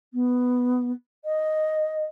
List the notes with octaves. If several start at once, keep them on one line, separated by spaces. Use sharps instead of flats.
B3
D#5